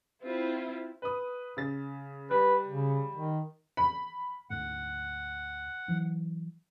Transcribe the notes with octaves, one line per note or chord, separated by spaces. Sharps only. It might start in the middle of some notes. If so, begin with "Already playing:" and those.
C4 E4 F4
B4 D#6
C#3 A6
G3 B4
C#3
D#3
B5
D2 G#2 A3 F#5
E3 F#3